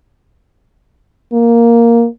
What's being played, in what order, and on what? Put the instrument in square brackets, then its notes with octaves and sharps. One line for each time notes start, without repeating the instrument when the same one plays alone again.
[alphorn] A#3